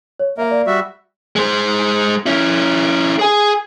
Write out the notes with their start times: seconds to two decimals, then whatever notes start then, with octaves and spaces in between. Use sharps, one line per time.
0.20 C#5
0.38 A#3 A#4 E5 F5
0.51 D5
0.67 G3 F#4 E5
1.36 G#3 C5
2.26 C#4 E4
3.19 G#4 G#5